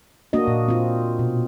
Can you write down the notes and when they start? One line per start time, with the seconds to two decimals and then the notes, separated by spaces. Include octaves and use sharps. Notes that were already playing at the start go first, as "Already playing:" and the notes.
0.33 A#3 D4 F#4 D#5
0.48 A#2
0.68 C4 F4
1.19 B2